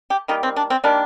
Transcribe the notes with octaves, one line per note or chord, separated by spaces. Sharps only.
G4
D#3 G3 A#3 D#4
C4
D4
C4
D#3 G3 A#3 D4